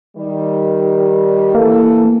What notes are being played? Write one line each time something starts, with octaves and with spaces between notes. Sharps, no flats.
D#3 G3
E3 A#3 A4